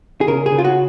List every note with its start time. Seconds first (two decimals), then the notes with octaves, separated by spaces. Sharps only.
0.21 G#4
0.27 C#3 A#4
0.46 G#4
0.52 C#3
0.58 F4
0.65 F#4